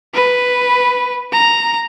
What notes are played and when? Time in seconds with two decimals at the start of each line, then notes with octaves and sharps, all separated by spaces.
0.14 B4
1.32 A#5